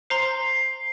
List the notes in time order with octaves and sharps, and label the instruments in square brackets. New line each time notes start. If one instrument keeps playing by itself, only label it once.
[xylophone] C5 A#5 C6 [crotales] C7